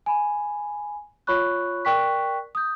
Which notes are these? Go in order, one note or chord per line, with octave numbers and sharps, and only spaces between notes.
G#5 B5
F4 C#5 B5 C#6 F#6
A#4 D5 G5 C#6 F#6 B6
D#6 G6